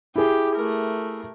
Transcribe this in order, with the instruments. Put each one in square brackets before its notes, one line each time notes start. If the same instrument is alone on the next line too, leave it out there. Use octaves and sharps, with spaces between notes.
[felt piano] E4 G#4 [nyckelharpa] G4
[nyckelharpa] A3 A#4